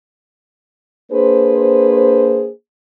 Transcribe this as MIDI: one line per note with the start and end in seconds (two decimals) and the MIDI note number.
1.12 2.49 58
1.12 2.49 62
1.12 2.49 68
1.12 2.49 71
1.12 2.49 72